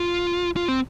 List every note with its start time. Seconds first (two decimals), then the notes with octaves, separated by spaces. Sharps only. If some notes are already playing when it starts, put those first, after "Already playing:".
Already playing: F4
0.56 F4
0.68 C4